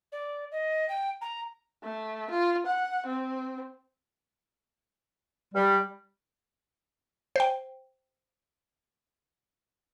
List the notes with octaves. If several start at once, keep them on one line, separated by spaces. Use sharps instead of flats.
D5
D#5
G5
A#5
A3
F4
F#5
C4
G3
C5 G5